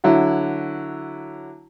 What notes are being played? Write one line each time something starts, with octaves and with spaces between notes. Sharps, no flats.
D3 F#3 E4